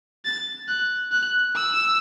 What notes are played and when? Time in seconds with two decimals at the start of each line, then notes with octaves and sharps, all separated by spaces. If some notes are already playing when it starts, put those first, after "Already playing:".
0.25 A6
0.68 F#6
1.12 F#6
1.56 E6